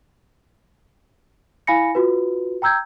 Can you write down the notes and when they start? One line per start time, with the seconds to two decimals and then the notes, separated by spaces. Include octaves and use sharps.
1.67 E4 F5 G#5 B5 A#6 C#7
1.95 F4 F#4 B4
2.62 G5 A#5 E6 G6 G#6